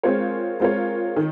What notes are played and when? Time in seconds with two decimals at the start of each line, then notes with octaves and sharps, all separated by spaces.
0.03 G#3 C4 F4 A#4 C#5
0.60 G#3 C4 F4 A#4 C#5
1.16 D#3